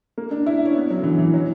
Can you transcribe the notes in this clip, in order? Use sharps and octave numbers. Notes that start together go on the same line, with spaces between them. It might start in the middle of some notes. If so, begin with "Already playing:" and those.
A#3
D4
E4
D4
C#4
B3
F#3
D3
E3
E3
F#3